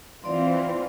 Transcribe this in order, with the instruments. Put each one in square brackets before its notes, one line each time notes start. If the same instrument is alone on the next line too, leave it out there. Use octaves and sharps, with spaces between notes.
[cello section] E3 C4 F4 [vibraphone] D5 C6